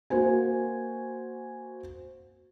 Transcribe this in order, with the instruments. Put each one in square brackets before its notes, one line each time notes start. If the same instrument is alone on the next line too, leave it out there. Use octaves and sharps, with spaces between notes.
[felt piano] A#3 F#4 C5 G#5